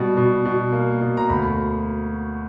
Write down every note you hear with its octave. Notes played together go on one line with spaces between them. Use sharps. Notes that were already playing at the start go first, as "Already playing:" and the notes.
Already playing: B2 G3
B2
B2
A#3
B2
A#5
D2 B5